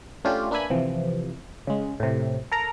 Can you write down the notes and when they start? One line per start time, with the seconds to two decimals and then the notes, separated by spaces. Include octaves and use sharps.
0.25 A3 C#4 D4 F4 G4
0.51 A#3 D4 B4 E5 G#5 B5
0.70 C3 E3 F3
1.67 C#3 G#3
2.00 A2 C3
2.52 A4 A#4 A#5